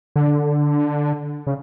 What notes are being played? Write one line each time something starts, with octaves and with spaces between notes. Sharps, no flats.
D3
C#3